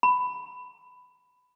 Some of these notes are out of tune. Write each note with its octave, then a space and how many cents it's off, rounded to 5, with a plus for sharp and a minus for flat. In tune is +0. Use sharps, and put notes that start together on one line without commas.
B5 +15